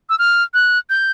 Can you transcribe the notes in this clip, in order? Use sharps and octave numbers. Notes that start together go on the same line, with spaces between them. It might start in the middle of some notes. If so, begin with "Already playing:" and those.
E6
F6
F#6
G6